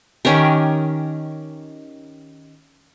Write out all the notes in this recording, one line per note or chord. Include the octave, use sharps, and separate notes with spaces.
D#3 C#4 G4 A#4